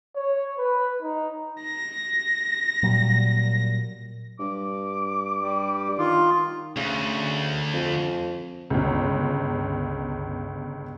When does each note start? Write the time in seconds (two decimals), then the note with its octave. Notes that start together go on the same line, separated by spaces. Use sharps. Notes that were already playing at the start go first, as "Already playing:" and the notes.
0.15 C#5
0.58 B4
1.02 D#4
1.62 A#6
2.83 A#2 F#3 G3
4.39 G2 D6
5.41 G3
5.99 D#3 F4
6.76 D2 C#3
7.73 F2
8.70 G1 C#2